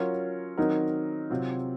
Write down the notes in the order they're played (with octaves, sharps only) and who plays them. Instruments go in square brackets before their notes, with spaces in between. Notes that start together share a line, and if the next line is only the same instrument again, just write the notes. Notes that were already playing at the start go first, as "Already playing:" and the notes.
Already playing: [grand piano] F#3 C#4 F4 A#4 C#5
D#3 F#3 C4 D#4 A#4
C3 F#3 C4 F4